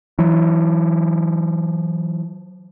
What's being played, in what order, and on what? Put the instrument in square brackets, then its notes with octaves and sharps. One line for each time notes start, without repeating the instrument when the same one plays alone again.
[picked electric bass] E3 F#3